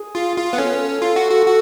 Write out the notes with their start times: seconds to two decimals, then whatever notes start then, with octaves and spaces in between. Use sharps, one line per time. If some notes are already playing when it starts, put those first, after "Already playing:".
Already playing: G#4
0.15 F4
0.37 F4
0.53 B3
0.58 C#4 A4
0.69 B4
0.79 A4
1.02 F4
1.16 F#4
1.31 F#4
1.46 F#4